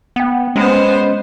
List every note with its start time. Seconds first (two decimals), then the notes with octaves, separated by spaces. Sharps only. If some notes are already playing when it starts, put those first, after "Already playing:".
0.16 B3 F#5 G5
0.56 G#3 B3 C#4 C5